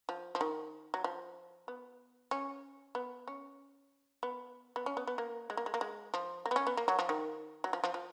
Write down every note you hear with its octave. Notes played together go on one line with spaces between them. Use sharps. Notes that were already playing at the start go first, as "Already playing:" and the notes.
F3
F3
D#3
F#3
F3
B3
C#4
B3
C#4
B3
B3
C#4
B3
B3
A#3
G#3
A#3
G#3
A#3
G#3
F3
A#3
B3
C#4
B3
A#3
F#3
F3
D#3
F#3
F3
F3
F3